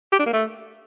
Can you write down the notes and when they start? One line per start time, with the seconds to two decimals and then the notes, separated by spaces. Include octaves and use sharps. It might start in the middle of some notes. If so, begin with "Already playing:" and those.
0.12 G4
0.19 D4
0.26 A#3
0.33 A3